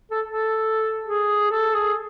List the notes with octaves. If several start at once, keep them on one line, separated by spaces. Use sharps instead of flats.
A4
A4
G#4
A4
G#4